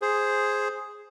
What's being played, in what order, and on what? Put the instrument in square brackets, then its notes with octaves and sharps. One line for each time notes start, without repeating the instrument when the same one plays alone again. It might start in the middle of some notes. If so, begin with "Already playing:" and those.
[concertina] G#4 C5